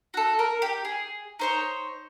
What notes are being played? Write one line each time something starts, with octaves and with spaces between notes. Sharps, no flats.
F#4 A4
A#4
G4
G#4
D#4 C5 C#5